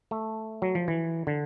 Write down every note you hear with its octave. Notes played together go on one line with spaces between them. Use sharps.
A3
F#3
F3
E3
D3